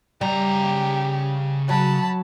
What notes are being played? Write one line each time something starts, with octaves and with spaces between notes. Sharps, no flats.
C#3 G3 G4 A#5
F#3 A5 B5